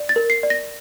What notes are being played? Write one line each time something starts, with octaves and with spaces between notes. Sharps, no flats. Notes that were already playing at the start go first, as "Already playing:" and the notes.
Already playing: D5
A6
A#4
C7
D5
A#6